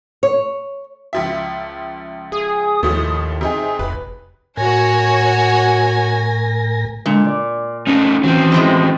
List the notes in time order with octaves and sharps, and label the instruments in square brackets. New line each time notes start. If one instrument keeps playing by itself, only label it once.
[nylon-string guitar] C#5
[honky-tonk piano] C#2 F3 E5
[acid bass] G#4 [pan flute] D#6
[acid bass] D#2 [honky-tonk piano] A2 F3 A3
[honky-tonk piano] C3 D#4 G#5 [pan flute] G#4
[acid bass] F1 [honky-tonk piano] B4
[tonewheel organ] A2 A#4 A#6 [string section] F#4 C#5 [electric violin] G#5
[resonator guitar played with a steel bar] A#2 [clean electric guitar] D3 G#3
[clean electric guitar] D5
[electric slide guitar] A3 D#4 F4 [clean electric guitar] C#4
[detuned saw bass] E3 [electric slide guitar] F#3 C4
[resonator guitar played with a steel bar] A2 F3 G#3